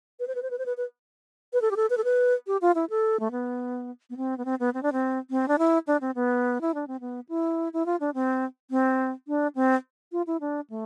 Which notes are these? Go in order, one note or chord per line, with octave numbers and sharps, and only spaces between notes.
B4
C5
B4
C5
B4
C5
B4
B4
B4
A4
G4
A4
B4
A4
B4
G4
F4
E4
A4
A3
B3
B3
C4
B3
C4
B3
C4
D4
C4
C4
D4
E4
D4
C4
B3
E4
D4
C4
B3
E4
E4
F4
D4
C4
C4
D4
C4
F4
E4
D4
A3